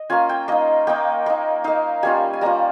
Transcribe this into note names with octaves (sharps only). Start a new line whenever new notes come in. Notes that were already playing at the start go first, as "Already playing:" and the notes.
Already playing: D#5
A#3 C#4 F4 G#5
G5
A#3 D#4 D#5
A#3 D#4 G5
A#3 D#4
A#3 D#4 F5
G3 A#3 C#4 F4 G#5
G#5
G3 A#3 C#4 F4 A#5